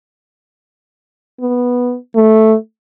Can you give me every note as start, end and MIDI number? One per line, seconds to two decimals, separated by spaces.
1.40 1.96 59
2.15 2.54 57